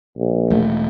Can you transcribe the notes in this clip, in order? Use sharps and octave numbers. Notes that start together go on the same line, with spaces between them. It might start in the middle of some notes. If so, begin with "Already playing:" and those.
A#1
E1 A3